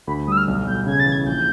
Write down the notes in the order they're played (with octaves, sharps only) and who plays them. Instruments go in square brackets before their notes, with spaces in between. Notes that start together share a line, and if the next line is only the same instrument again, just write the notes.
[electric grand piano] D2 [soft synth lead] B5
[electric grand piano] G3 [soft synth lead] D#6 E6
[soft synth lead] F6
[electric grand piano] B1
[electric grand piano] B1 [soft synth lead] G6
[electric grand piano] C#3 [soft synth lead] G#6
[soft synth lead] A6
[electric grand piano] E3
[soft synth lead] G#6
[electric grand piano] A#1 [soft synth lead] G6